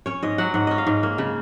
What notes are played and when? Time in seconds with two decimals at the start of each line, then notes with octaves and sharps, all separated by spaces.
0.06 C#4 C#5
0.23 G#2 D#5
0.38 F#3 F#5
0.54 G#2 F#5
0.67 C#4 D#5
0.78 F5
0.87 G#2
1.03 A#3
1.18 C#3